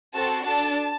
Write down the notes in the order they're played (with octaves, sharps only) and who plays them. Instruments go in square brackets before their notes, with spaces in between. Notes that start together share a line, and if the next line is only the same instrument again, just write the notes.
[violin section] C4 F#4 A4 A5
D4 A4 A5